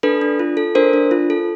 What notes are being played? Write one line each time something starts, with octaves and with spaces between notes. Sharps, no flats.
D4 A4 B4
D4
F4
A4
D4 A#4 C5
D4
F4
A4